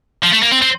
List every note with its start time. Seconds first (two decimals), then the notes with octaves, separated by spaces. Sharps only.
0.24 F3
0.33 A3
0.43 A#3
0.52 C4
0.62 C4